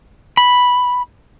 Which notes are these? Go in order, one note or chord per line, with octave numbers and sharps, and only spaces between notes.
B5